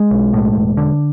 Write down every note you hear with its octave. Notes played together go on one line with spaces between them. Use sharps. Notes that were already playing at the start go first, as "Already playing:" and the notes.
Already playing: G#3
B1
A2
E1
D3